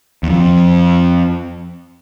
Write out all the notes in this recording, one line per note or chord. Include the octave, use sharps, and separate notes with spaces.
E2
F2